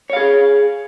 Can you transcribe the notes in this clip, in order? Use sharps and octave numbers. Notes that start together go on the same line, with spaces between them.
G#4 C#5 F5